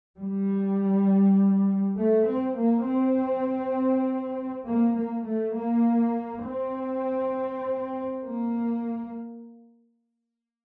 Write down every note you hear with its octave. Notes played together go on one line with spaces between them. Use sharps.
G3
A3
C4
A#3
C4
A#3
A#3
A3
A#3
C4
A#3